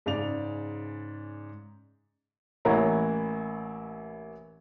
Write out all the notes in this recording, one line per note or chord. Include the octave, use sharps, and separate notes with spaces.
G#2 C#3 D5 F7
A1 E3 A#3 E4 C#5 A#5